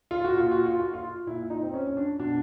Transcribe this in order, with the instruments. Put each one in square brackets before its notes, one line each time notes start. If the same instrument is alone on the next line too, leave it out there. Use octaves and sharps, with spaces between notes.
[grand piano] F4
F#4
A#2 F4
F#4
F4
F#4
F4
A#2 E4
D#4
C4
C#4
C#4
D4
B2 D4